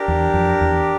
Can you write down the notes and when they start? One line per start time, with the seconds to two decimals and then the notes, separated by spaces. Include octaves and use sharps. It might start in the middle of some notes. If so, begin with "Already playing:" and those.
Already playing: D4 G4 A#4
0.08 E2
0.34 F2
0.61 E2